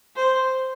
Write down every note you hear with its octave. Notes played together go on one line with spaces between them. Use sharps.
C5